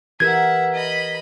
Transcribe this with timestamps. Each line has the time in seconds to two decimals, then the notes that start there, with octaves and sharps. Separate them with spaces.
0.20 E3 G4 A#4 E5 F#5 G#6
0.74 D#5 B5